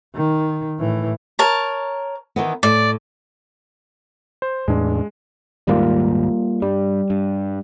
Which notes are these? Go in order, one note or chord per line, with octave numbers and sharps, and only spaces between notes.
D#3
A2 E3
A#4 C#5 A5
D#3 E3 B3
A2 D5
C5
E2 A2 G#3 D4
D#1 D#2 G#2 G3 A#3 F4
G2 G3
G2